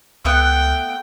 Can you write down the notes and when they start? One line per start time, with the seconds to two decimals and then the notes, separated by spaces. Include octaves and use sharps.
0.25 C#2 A3 B3 F#5 G5